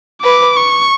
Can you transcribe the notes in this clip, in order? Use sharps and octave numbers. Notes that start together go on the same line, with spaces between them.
B4 D6
C#6